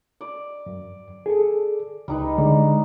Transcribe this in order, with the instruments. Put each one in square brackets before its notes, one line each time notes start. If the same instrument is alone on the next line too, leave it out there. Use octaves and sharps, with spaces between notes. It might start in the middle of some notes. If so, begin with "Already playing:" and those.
[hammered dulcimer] D5
[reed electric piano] F#2
G#4 A4
[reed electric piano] C#2 [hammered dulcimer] G3 D#4 B4
[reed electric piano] D3 G#3 D5